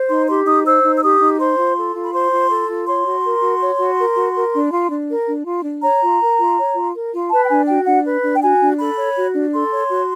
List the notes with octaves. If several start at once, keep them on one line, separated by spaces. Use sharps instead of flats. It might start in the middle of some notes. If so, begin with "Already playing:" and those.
Already playing: C5
D#4 C6
G4 C6
D#4 D#6
C5 E6
D#4
E6
G4 D#6
D#4
C5 C6
F4
A4
F4
B5
C5 C6
F4
A4
F4
C#5 C6
F#4
A#4
F#4
C#5
F#4
A#4
F#4
A#4
D4
F4
D4
A#4
D4
F4
D4
C#5 A#5
F4
A#4
F4
C#5
F4
A#4
F4
B4 A5
G5
D4 G#5
F#4 G5
D4 F#5
B4
D4
G5
F#4 G#5
D4
A4 B5
C#5
F#4
D4
A4 C6
C#5
F#4